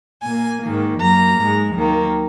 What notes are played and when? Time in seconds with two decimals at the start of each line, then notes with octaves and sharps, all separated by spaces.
0.24 A#2 G#5
0.29 A#3
0.62 G#2 D#3 A#3
0.99 F#2 F#3 A#3 A#5
1.38 G#2 G#3
1.75 D#2 D#3 F#3 A#3